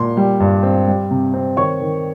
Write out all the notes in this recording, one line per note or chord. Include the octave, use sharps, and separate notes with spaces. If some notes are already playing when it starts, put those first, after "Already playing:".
Already playing: A#2 C6
G3
G2
C4
G3
C3
C4
D#3 C#5 C#6
D#3